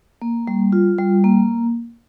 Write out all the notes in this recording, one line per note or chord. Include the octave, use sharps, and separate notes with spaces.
A#3
G3
F4
G3
A#3